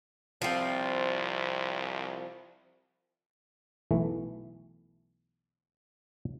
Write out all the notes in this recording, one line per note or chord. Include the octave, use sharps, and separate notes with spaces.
C2 F3 C4
B1 E3 A3